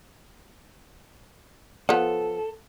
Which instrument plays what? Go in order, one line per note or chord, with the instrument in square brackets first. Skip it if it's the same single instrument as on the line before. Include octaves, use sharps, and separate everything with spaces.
[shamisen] F3 B3 [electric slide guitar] A4